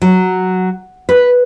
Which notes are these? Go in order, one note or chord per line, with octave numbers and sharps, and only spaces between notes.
F#3
B4